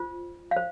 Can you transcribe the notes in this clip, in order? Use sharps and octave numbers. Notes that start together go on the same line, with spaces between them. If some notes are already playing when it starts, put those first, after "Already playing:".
Already playing: F4 C5
F5
C5